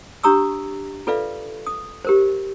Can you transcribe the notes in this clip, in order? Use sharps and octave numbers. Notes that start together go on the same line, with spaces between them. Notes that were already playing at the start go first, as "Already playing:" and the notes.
D4 G4 A#5 C#6 D#6 E6
F4 A4 B4 D5 E5 F5
D#6
G4 A#4 C5